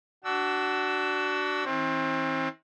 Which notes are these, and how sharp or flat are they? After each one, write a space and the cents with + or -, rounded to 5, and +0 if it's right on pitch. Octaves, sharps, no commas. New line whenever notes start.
D4 +0 F#4 +20 E6 +0
E3 -40 C4 +30